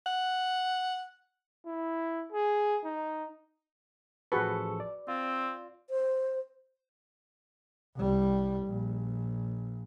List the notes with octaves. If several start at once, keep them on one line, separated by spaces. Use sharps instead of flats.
F#5
E4
G#4
D#4
A1 F3 F#4 G#4 A4 B4 C#6
D5
C4 F4
C5
C2 G3
A#1